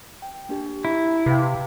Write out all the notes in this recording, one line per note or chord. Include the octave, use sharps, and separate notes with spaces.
G5
A#3 D4 G4
E4 A#5
C3 B4 F5 G5